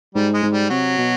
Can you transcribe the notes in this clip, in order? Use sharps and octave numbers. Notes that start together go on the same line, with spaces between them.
G#2 G3
G#3
G#2
G3
C3 F#3
B2